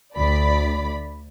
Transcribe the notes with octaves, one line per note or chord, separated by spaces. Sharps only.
D2 D5 B5